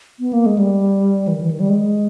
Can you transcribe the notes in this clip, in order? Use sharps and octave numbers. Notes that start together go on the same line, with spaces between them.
B3
A#3
G#3
G3
E3
D#3
E3
D#3
G3
G#3